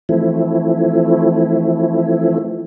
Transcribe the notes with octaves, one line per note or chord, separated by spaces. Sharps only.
E3 F3 A3 C4 E4